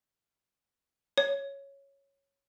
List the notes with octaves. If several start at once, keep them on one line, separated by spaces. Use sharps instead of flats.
C#5